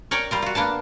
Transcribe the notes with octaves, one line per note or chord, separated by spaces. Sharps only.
A#4 C#5 D5 G5
G3 F4 A#4
F4 F#4
A#3 B3 D4 A5